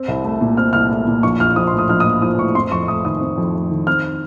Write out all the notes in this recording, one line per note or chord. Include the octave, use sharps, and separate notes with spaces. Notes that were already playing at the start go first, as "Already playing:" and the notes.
Already playing: C4
C2
A3
A#2
C4 F6
C2 F6
A3
A#2
A#1 C#6
A#1 F6
F3 D#6
C6
A2
D#6
A#1 F6
D#6
A#1
F3 D#6
A2 C#6
C4 C6
F2 C#6
A3 D#6
D#3 D#6
C4
F2
A3
D#3
C4 F6